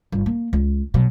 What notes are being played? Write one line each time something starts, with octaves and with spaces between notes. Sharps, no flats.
G1
A#3
C#2
B2 F#3